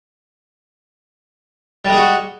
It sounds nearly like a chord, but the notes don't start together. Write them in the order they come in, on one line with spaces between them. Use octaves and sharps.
G3 G#3 G#4 F#4